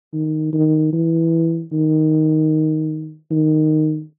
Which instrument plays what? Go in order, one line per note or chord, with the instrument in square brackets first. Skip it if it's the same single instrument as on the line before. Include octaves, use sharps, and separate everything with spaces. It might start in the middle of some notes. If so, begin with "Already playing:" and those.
[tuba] D#3
D#3
E3
D#3
D#3